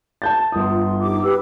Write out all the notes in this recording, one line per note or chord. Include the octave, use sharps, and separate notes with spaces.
A5 G6 A6
G1 F4 D#6
D#4 G4 D6
G4 B4 E6